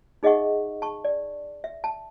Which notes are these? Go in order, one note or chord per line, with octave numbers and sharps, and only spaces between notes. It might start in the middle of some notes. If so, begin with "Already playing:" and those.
D#4 G#4 D#5 E5 F#5 C#6
A5 C#6
D5
E5
A5